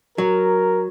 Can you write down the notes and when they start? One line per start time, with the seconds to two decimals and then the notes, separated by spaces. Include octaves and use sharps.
0.18 F#3 A#4